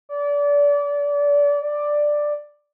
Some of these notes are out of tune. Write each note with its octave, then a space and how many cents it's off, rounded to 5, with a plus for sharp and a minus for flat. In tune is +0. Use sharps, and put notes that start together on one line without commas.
D5 -30
D5 +5